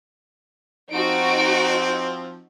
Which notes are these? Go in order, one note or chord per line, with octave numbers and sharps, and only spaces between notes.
F3 C4 D#4 F#4 D7